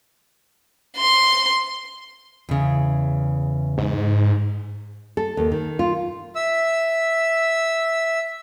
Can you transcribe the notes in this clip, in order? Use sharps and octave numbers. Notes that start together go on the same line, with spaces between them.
C6
E2 C#3
G#2
A4
D#2
D#3
F4
E5 E6